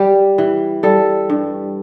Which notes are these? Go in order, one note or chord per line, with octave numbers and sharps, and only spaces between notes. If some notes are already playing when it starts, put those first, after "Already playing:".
Already playing: G3 G4
E3
G3 A4
G2